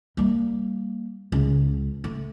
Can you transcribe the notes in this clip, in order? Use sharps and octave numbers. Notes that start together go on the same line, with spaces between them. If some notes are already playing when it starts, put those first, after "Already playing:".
G3 A#3
C#2 C#3
A3